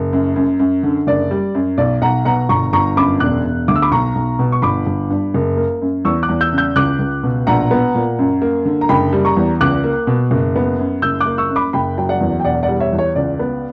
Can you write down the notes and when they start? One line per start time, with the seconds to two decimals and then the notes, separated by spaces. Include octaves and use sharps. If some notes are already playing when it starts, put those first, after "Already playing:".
Already playing: F#1
0.13 F#2
0.36 F#2
0.59 F#2
0.83 D3
1.07 F#1 D5
1.31 G3
1.55 F#2
1.78 B1 D5
2.02 B1 F#5 A#5
2.25 B2 F#5 A#5
2.49 G1 A#5 C#6
2.73 G1 A#5 C#6
2.96 F#2 B5 D6
3.20 E1 D6 F#6
3.44 E1
3.68 D2 D6
3.76 E6
3.82 B5 D6
3.91 B1 A#5 C#6
4.15 B1
4.39 B2
4.52 C#6
4.62 G1 B5 D6
4.86 G1
5.10 G2
5.34 F#1
5.57 A#3
5.82 F#2
6.05 E2 C#6 E6
6.23 D6 F#6
6.29 E2
6.41 E6 G6
6.52 C#3
6.58 E6 G6
6.76 C#2 D6 F#6
6.99 C#2
7.24 B2
7.47 A#1 F#5 A#5
7.71 B3
7.95 A#2
8.19 F#2
8.42 A#3
8.65 D3
8.81 A#5
8.89 F#1 G5 B5
9.13 G3
9.25 A#5 C#6
9.37 E2
9.61 C#2 D6 F#6
9.84 A#3
10.07 B2
10.31 F#1
10.56 B3
10.79 F#2
11.02 F#1 E6 G6
11.21 D6 F#6
11.26 A#3
11.38 C#6 E6
11.50 F#2
11.56 B5 D6
11.73 F#1 G5 B5
11.98 F#3 G5
12.09 D5 F#5
12.21 E2
12.40 G5
12.45 E1 D5 F#5
12.63 D5 F#5
12.68 G3
12.80 C#5 E5
12.93 E2
12.98 C#5
13.15 C#2 D5
13.39 B3